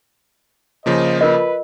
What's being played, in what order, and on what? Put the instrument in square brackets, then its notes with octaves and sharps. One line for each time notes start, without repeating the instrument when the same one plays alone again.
[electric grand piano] C#3 F3 A#3 [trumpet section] C5 D#5
[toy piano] F4 A#4 D#5 [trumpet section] B4